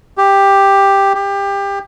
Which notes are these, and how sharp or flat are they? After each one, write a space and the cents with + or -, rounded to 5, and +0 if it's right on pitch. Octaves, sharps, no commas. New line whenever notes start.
G4 +10
G4 +25